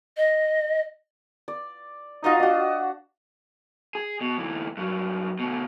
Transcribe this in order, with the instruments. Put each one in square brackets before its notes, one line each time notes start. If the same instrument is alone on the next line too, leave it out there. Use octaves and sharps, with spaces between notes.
[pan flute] D#5
[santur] D5
[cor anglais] D#4 [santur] F4 F#4 D#5
[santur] D4 F#4 [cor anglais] D#5
[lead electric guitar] G#4
B2
D2 E3
G2 F#3
D2 B2